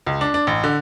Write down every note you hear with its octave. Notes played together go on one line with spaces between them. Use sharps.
C#2
D4
D4
A1
D3